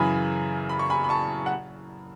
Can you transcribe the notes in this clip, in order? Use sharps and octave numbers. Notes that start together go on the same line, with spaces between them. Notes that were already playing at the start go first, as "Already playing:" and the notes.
Already playing: F#2 C#3 E3 G#5 B5
B5
C#6
G#5 B5
B5
A5 C#6
F#5